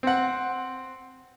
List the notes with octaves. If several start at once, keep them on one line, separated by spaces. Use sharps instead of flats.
C4 F#5